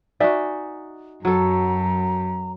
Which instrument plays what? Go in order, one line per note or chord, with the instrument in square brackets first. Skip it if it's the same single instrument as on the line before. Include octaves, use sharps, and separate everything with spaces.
[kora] D#4 F#4 [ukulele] D5 E5 G#5
[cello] F#2 [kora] F#3 A4 [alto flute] A#5